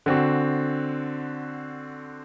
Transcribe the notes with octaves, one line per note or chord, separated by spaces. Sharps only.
D3 C4 F#4